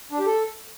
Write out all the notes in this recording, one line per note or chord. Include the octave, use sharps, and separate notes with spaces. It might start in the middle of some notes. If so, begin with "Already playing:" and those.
D4
G4
A4